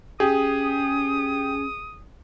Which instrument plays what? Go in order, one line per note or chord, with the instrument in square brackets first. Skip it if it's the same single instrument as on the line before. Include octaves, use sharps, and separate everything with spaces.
[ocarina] C#4 [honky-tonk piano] G4 [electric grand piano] G#4 [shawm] D#6